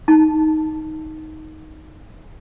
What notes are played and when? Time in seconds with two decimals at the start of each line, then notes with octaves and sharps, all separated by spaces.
0.08 D#4 A5